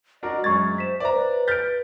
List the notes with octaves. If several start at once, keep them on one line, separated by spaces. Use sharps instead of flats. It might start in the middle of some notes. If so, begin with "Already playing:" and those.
D4 F#4 A#4 D#5
F#2 G#3 C#6 G#6 A6
C5 B6 E7
B4 C5 D5 E5 A#5
F6 G6 A6 B6 D7